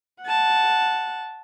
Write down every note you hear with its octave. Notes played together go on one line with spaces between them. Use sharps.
F#5 A5